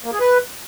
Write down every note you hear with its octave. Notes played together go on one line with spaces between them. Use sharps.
A#3
G#4
B4